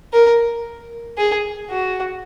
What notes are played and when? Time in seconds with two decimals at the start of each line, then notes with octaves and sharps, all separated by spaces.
0.13 A#4
1.18 G#4
1.70 F#4